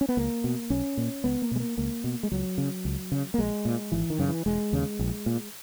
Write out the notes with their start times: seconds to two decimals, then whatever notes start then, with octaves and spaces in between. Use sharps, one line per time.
0.01 C#4
0.09 B3
0.17 C#2 A#3
0.44 B2
0.70 B1 C#4
0.97 A#2
1.24 C#2 B3
1.42 A#3
1.51 B2 G#3
1.60 A#3
1.78 C#2 A#3
2.04 B2
2.23 G#3
2.32 C#2 F#3
2.58 C#3
2.85 C#2
3.12 C#3
3.34 A#3
3.38 A#1 G#3
3.65 A#2
3.92 G#1 E3
4.10 D#3
4.19 F#2 C#3
4.28 E3
4.46 E1 G#3
4.73 D#2 C#3
4.99 A#1
5.26 A#2